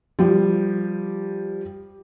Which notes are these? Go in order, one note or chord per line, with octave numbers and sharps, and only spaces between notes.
F3 G3 G4